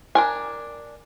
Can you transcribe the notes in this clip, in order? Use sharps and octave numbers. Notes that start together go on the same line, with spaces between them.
D4 A#4 G#5